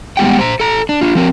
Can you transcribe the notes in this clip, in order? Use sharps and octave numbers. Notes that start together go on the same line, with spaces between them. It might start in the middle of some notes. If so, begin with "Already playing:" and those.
G3 G#3 B3 G4 F#5 G5
C5 A#5
A4 A#5
D4
D4 F4
F3 C4 A#4